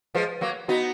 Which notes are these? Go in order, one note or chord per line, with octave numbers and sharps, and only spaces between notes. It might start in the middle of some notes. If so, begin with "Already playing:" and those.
F3 G#3 B4
F#3 A#3
B3 D#4 F#4